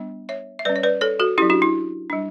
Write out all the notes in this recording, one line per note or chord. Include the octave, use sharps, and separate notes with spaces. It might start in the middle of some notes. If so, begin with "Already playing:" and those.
Already playing: G3 B3 D4
C#5 E5
E5
G3 C#4 B4 D5
C#5
B4 D5
A4 C#5
F#4 A4
F#3 C#4 E4 G4
D4 F#4
E4
G3 D4